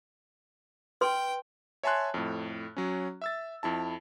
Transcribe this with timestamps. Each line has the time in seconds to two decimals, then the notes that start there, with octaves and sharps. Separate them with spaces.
1.01 B4 G5 C6
1.83 C#5 E5 G#5 A5 C6 F#6
2.14 F2 A2
2.77 F#3 C#4
3.22 E5 E6 A6
3.63 F2 E4 A5